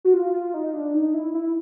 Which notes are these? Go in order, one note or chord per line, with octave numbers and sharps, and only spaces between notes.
F#4
F4
F4
D#4
D4
D#4
E4
E4